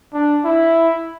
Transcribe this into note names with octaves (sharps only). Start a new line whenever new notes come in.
D4
E4